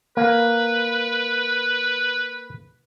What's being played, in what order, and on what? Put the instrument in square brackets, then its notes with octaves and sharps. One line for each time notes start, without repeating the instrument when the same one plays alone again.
[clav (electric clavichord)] A#3 [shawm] B4